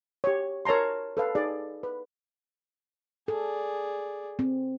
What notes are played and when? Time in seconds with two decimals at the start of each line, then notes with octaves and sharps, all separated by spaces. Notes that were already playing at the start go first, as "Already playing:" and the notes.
0.24 G4 C#5
0.65 A#4 C#5 A5 A#5 C6
1.17 A4 B4 F5
1.35 D#4 G#4 D5
1.83 B4
3.28 G#4 A4 D5
4.39 C4